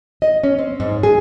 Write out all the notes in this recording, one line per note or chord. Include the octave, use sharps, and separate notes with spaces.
D#5
C#4
C4
G#2
G#4